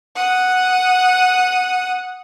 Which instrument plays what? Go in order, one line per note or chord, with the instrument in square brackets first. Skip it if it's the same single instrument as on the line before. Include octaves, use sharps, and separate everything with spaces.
[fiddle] F#5 D#6